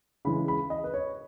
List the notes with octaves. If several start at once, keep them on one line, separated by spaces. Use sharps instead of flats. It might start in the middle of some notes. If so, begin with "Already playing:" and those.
C#3 E3 G#3 B5
B5
D#5
B4
C#5